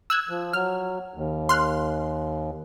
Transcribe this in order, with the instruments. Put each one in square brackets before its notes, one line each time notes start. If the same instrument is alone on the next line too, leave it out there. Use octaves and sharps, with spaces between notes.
[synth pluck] E6 F#6 G#6
[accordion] F3
[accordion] F#3 [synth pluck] F6
[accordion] D#2
[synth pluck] C6 F6 F#6